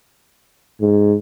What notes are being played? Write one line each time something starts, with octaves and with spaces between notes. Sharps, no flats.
G#2